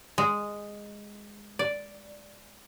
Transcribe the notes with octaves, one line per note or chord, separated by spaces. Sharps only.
G#3
D5